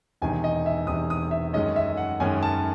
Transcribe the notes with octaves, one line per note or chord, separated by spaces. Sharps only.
E1 E2 C3 D#3 G#5
D#5
E5
E1 E2 C3 D#3 D#6
D#6
E5
F#2 D#3 G#3 C#4 D#5
E5
F#5
F#2 D#3 G#3 C#4 G#5
A5